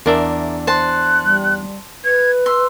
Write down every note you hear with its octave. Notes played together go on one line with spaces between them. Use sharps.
E2 D4 A#4 E5
C5 A5 F#6
G3
B4 G#6
C6 E6